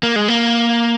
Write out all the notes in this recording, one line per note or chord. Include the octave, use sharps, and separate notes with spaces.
A#3
G#3
A#3